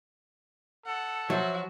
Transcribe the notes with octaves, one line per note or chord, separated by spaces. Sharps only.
A4 F#5
F3 F#3 F#4 E5